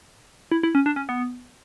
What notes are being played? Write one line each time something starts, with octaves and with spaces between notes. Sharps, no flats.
E4
E4
C#4
D4
C#4
B3